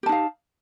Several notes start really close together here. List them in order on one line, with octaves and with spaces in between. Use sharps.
G4 A5 D#4 F5